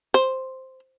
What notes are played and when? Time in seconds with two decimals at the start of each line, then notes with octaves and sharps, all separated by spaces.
0.14 C5